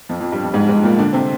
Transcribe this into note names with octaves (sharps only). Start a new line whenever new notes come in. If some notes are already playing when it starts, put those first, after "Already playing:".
F2 F3
F2 F3
G2 G3
F2 F3
G#2 G#3
G#2 G#3
A#2 A#3
D3 D4
C3 C4